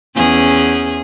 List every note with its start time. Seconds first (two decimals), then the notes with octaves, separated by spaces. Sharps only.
0.16 E2 C#4 G#4